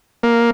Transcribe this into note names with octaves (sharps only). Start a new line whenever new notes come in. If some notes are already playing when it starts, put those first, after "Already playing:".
A#3